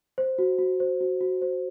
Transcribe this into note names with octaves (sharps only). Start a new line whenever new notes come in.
C5
F#4
F#4
C5
F#4
F#4
C5